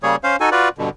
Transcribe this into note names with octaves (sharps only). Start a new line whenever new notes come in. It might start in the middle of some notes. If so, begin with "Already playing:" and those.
C#3 G3 A#3 G#4 C#5
C#4 C5 F5
D#4 F#4 A4 G#5
F4 F#4 B4 D5
G2 B2 D3